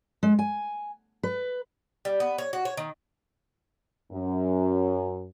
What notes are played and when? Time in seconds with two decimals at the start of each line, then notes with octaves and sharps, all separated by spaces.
0.23 G#3
0.39 G#5
1.23 B4
2.05 G3
2.20 B3
2.38 C#5
2.53 F#4
2.65 C#5
2.77 D#3
4.12 F#2